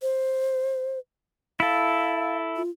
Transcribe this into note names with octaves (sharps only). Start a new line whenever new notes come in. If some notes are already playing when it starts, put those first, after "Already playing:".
C5
E4 A4 F5
F4